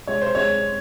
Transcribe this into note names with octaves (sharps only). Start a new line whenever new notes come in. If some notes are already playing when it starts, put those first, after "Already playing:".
G#3 C#5
C5
G#3 C#5